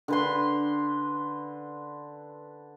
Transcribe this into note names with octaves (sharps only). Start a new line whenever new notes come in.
D3 B4 C6